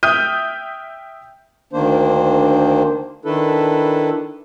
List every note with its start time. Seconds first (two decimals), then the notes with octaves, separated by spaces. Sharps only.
0.03 E5 G5 D#6 F6 G6 D#7
1.73 D2 D#3 A#3 D4 C5
3.25 D#3 D4 E4 A4 B4